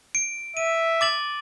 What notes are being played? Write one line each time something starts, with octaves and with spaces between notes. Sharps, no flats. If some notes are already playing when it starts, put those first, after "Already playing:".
D7
E5 D#7
D6 A6 F#7